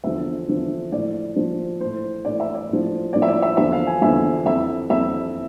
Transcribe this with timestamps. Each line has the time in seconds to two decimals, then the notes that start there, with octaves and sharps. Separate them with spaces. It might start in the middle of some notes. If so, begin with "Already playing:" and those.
0.04 E2 D3 F3 E5
0.48 E2 D3 F3
0.92 A2 F3 D5
1.36 A2 F3
1.81 A2 E3 C5
2.25 A2 E3 D5
2.40 E5
2.54 D5
2.69 A2 F3
3.13 A2 F3 D5
3.22 E5
3.28 D5
3.42 E5
3.57 E2 D3 F3 E5
3.72 F5
3.87 G#5
4.01 E2 D3 F3 E5
4.46 F2 E3 E5
4.90 F2 E3 E5